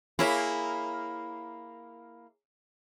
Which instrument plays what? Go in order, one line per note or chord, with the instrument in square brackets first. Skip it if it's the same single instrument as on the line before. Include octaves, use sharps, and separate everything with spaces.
[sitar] A#3 E4 [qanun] G#4 C#5 E5